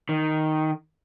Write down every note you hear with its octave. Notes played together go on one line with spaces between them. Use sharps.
D#3